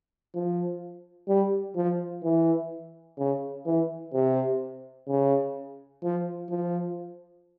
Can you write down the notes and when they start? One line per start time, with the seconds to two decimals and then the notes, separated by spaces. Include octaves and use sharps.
0.34 F3
1.29 G3
1.76 F3
2.24 E3
3.18 C#3
3.66 E3
4.13 C3
5.08 C#3
6.03 F3
6.50 F3